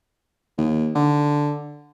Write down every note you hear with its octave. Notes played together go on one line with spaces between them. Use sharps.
D#2
D3